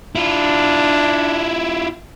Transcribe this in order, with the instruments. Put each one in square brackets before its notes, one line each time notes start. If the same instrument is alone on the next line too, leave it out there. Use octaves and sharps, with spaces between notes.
[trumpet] D4 [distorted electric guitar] E4 F4